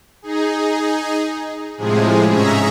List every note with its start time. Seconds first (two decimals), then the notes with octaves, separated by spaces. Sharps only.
0.22 D#4 G#4
1.78 A2 C3 F3 G#3 G#4
2.29 G#2 C#4 G#4 E5 A#5